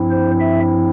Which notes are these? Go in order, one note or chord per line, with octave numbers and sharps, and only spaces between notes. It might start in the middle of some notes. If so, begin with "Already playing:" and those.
Already playing: G2 F3 C4 E4
C5
E5